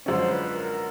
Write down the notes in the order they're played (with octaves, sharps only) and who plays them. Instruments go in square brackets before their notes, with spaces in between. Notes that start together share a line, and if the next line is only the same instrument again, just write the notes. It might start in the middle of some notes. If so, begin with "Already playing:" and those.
[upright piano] F#2 D3 F3 G#3 C#4 [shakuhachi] C5
[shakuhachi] B4
A#4